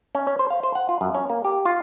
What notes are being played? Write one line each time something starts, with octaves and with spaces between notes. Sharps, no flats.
C#4
C#4
C5
F5
C5
F#5
F4
F#2
C#4
A#3
G4
F4